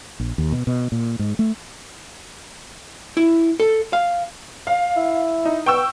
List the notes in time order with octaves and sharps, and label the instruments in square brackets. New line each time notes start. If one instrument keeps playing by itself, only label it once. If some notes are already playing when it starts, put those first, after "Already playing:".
[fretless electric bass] A#1
D#2
B2
B2
A#2
G#2
A3
[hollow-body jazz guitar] E4
A4
F5
[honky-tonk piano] F5
[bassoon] E4
[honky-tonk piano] D#4
[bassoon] B3 [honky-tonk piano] G5 C#6 E6